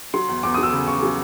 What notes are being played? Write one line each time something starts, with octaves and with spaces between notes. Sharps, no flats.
F#3 C6
E2
E2 D6
F#3 D#6
E6
C#3
C#3 C#6
F#3